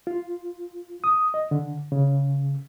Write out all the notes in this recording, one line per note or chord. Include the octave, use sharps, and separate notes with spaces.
F4
D#6
D#5
D3
C#3